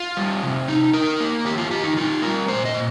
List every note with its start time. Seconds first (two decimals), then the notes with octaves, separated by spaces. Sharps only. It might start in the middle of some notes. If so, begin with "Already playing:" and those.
Already playing: F4
0.17 G3
0.43 C3
0.68 D#4
0.93 D#4 A#4
1.20 A#3
1.45 D#3 G4
1.58 F4
1.71 D#3 G4
1.84 D#4
1.97 D#4 F4
2.22 G3 A#4
2.48 A#2 C5
2.65 D#5
2.74 A#2